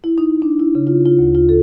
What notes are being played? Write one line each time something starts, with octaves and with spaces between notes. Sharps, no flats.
E4
D#4
D4
E4
C#3
F4
F4
D2
F4
A4